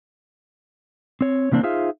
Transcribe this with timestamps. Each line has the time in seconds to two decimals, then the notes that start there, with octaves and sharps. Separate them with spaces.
1.21 C4 C#5
1.52 C3 E3 A#3 C4 D4
1.63 D#4 F4 G#4 C5 E5 F5